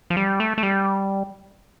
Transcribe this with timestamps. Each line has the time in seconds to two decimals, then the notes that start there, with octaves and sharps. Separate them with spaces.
0.10 F3
0.17 G3
0.40 A3
0.58 A3
0.63 G3